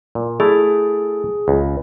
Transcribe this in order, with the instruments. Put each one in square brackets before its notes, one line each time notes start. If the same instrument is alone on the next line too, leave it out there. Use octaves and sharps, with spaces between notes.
[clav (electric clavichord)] A#2
[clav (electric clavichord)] A3 E4 [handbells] G#4
[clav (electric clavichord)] C#2